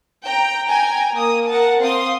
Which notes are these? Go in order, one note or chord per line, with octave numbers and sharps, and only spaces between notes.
G5 A#5
G5 G#5 A#5
A#3 D#6
A#4 F#5 A5
C4 F5 C6 D#6